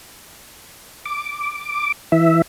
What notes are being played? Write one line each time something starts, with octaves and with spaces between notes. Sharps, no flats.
D6
E3 E5